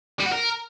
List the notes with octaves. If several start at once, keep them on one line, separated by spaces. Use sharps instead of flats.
G3
F#4
A#4